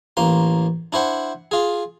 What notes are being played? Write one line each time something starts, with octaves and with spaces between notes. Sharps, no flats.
A1 A#3 C6
D4 E4 C5 F#5
F4 G#4